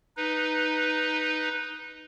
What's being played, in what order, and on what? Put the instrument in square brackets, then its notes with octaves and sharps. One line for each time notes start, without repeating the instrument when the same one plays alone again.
[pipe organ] D#4 B4